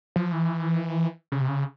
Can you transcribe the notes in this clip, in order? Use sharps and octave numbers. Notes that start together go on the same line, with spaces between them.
F3
E3
C#3
C3
C#3